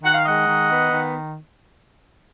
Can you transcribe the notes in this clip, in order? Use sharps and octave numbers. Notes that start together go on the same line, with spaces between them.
D#3 F#5
F5
G#3 D#5 F#5
D#3
B3
D#3